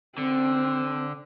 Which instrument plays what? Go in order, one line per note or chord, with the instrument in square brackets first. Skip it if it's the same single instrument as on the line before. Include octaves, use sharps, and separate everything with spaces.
[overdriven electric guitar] D3 [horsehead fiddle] C4